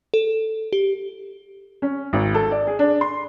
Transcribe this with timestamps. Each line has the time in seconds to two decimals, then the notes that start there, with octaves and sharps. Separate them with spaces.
0.14 A4
0.73 G4
1.82 C#4
2.13 G#1
2.34 A4
2.51 D5
2.67 G#4
2.79 D4
3.01 C6